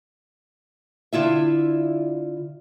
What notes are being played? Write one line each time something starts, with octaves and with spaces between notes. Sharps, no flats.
D3 E4 F4 E5